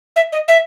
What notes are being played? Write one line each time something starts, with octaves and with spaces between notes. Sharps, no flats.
E5
D#5
E5